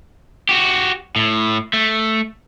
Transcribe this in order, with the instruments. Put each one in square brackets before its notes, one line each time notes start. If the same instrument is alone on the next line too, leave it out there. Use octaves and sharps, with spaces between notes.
[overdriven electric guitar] F#4 G4
A2
A3